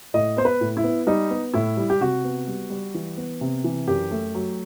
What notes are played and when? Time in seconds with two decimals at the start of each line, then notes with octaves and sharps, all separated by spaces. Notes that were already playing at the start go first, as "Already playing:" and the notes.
0.14 A2 D#5
0.37 B3 C5
0.45 B4
0.61 A2
0.77 E4
0.84 B3
1.07 G3 D#4
1.30 B3
1.54 A2 E4
1.77 G3
1.90 G4
2.01 C3 F#4
2.24 B3
2.48 G3
2.70 G3
2.94 E3
3.17 B3
3.41 C3
3.64 E3
3.88 F#2 G4
4.11 A3
4.35 F#3